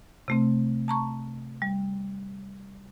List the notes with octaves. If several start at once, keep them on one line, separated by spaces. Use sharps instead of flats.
C3 A3 C4
A5 A#5 C#6
G3